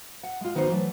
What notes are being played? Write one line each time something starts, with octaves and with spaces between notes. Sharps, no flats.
F#5
G#3 F4
D#3 B3 D#4 F#4 C5
E3 F#3 A3